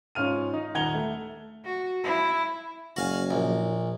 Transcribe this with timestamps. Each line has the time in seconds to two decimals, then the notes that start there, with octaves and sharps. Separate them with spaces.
0.15 G#2 C#4 F4 F6 D#7
0.53 D#4
0.75 D#1 F#5 A#5 G#6 F7 G7
0.95 A3
1.65 F#4
2.04 E4
2.96 F#1 F#4 F5 G#5
3.31 A#1